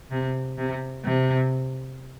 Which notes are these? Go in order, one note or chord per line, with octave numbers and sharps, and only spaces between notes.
C3
C3
C3